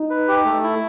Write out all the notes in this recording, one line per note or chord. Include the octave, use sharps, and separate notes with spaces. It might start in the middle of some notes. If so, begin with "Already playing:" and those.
Already playing: D#4
B4
G4
A3
E4